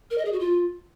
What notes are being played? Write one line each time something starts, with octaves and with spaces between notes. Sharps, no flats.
A#4
D#5
G#4
F#4
F4